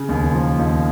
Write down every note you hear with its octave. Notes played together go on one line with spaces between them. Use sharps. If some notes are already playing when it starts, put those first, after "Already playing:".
Already playing: C#3
D#2
F3
D#2